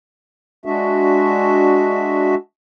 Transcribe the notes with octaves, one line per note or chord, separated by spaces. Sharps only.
G#3 D4 F#4 E5